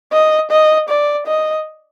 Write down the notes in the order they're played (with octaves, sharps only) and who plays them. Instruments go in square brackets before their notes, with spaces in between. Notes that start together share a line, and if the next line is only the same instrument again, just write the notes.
[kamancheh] D#5
D#5
D5
D#5